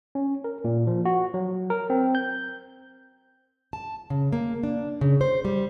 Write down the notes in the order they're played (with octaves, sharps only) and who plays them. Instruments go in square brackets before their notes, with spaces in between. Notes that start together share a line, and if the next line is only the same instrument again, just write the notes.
[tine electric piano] C#4
A#4
A#2
F3
F#4
F#3
A#4
C4
G6
[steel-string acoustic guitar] A5
C#3
A#3
D4
C#3
C5
G3